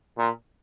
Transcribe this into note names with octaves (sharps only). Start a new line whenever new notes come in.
A#2